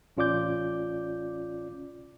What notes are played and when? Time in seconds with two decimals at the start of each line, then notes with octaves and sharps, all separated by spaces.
0.17 A1 C#4 F4 D5 D6 G6